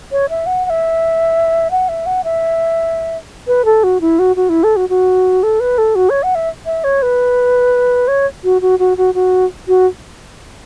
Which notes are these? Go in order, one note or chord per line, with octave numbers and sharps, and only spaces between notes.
C#5
E5
F#5
F#5
E5
F#5
E5
F#5
E5
B4
A4
F#4
E4
F#4
F#4
E4
A4
F#4
F#4
A4
B4
A4
F#4
C#5
F#5
E5
E5
C#5
B4
C#5
F#4
F#4
F#4
F#4
F#4
F#4